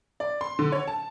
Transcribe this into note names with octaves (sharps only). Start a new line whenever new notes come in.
D5
C6
D3
C#5
A5